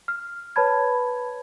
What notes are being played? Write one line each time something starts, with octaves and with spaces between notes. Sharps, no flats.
F6
B4 C#5 A5 B5 G#6